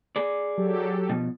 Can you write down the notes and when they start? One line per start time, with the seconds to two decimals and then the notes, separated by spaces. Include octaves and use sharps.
0.16 G#4 D5
0.57 F#3 G4 A4
1.09 B2 F3